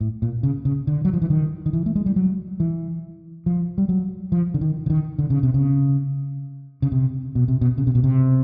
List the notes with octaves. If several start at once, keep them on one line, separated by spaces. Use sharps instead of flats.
A2
A#2
C#3
C#3
D3
F#3
F3
E3
D#3
D#3
E3
A3
G#3
G3
F#3
E3
F3
G3
F#3
F3
D3
D#3
D3
D#3
D3
C#3
C3
C#3
C#3
C3
B2
C3
B2
C#3
C3
B2
C3